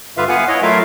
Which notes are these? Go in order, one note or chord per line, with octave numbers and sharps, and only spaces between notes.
G2 D3 F4 B4 E5 F5
B3 B4 F5 F#5 G#5
E4 C#5 D#5
F#3 A3 F4 A#4 E5 F5